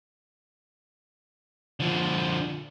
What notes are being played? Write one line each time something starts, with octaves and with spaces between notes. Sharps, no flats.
D3 F3